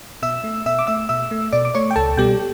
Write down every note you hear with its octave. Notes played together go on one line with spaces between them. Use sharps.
B2 E5 E6
A3
B2 E5 E6
D6
A3 E5 E6
B2 E5 E6
A3
B2 D5 D6
D6
A3 C#5 C#6
G5
C#2 A4 A5
B2 G3 B3 G4 G5